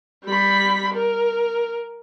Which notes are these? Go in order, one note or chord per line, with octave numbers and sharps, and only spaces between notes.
G3 B5
A#4